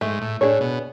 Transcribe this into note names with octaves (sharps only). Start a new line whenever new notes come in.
G#2 A3
A2
A2 D4 G#4 C#5
B2